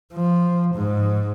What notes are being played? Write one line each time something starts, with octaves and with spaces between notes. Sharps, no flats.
F3
G#2